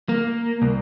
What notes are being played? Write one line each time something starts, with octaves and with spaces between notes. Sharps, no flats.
A#3
C2